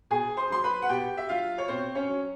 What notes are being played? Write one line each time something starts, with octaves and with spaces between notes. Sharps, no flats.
B2 G#4 G#5
C5 C6
F#3 C6
B4 B5
F#5
B2 G4 G5
E5
F#3 F4 F5
C#5
B2 C4 C5
C#4 C#5
F#3